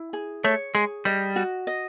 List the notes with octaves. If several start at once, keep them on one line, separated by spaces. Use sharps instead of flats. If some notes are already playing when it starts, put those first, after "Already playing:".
Already playing: E4
G#4
A3 C#5
G#3 G#4
G3 D#5
F#4
D#5